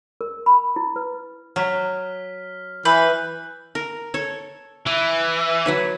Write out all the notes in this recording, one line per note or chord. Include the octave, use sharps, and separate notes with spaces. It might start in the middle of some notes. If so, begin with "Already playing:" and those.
A#4
B5
E4
B4
F#3 F6 B6
E3 B4 F#6 G6
A#4
A4 C#5
E3 D6
F#3 B4 C#5